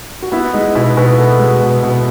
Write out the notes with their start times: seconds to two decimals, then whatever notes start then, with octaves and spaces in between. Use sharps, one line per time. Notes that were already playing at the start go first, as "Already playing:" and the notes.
0.22 F#4
0.32 B3 E4
0.53 G#3 D#4
0.75 B2 E4
0.96 B2 F#4
1.18 B3 A4
1.39 G#3
1.61 B2
1.83 B2